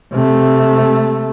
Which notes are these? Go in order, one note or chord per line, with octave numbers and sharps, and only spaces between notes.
C3 A3